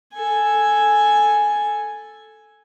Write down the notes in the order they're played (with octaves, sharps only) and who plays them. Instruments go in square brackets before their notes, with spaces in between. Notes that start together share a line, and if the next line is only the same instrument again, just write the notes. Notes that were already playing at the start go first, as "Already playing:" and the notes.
[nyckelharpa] A4 G#5